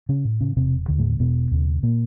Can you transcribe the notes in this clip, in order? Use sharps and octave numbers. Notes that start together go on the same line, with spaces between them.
C#3 C#4
A2
C#3 C#4
E1 C3 C4
D#2 D3
A2 A3
E1 B2 B3
D#2 C#3
A#2 A#3